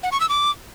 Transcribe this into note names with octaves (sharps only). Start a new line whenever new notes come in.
F#5
C#6
E6
D6